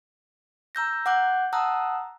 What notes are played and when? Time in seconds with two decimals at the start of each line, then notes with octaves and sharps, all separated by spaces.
0.75 A#5 E6 G6 A#6
1.06 F#5 D6 F#6 G6
1.53 F#5 A5 A#5 D#6 E6 F#6